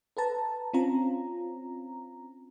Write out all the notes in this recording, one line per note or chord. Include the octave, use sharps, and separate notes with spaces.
A4 B4 A5 A#5
C4 C#4 F4 A#5